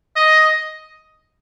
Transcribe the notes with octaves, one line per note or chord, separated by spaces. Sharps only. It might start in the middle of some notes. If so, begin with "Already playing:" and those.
D#5